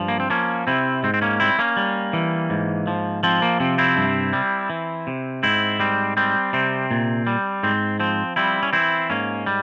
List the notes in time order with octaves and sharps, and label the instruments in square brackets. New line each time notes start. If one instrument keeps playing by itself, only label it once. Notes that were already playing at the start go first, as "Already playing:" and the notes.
Already playing: [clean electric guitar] G2 F3
A#3
C4
F3 A#3 C#4
C3 C4 E4
G#2 C4
C4
A#3 C#4
G3 C4 E4
A#3 C#4
G3
E3
G#2
F3
F3 C4
A#3
C3 C4
C4 E4
G2
G3
E3
C3
G#2 C4 E4
G3 C4
G3 C4
C3 C4
A#2
G3
G#2 C4
F3 C4
G3 C4 E4
C#4
E3 C4 E4
G#2 A#3 C#4
G3